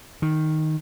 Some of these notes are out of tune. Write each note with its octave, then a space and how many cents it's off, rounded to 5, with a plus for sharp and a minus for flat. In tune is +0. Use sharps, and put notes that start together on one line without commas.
D#3 +0